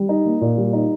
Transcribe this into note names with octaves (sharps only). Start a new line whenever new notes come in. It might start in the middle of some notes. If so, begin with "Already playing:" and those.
Already playing: G3
D#4
A#3
A#2
G3
D#4